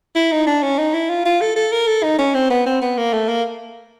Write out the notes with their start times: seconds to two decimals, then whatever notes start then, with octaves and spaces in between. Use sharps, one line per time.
0.16 E4
0.32 D#4
0.47 D4
0.63 C#4
0.78 D#4
0.94 E4
1.10 F4
1.26 F4
1.41 A4
1.56 A4
1.72 A#4
1.88 A4
2.04 D#4
2.19 C#4
2.34 C4
2.50 B3
2.66 C4
2.82 B3
2.97 A#3
3.13 A3
3.29 A#3